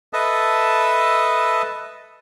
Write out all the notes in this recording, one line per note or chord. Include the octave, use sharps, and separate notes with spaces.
A4 B4 D#5 E5 A5 D#6